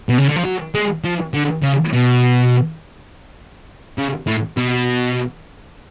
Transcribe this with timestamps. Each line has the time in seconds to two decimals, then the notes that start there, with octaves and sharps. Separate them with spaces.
0.09 B2
0.18 C#3
0.28 D3
0.36 F3
0.45 F#3
0.74 G#3
1.04 F3
1.34 D3
1.63 C#3
1.93 B2
3.98 C#3
4.27 A2
4.57 B2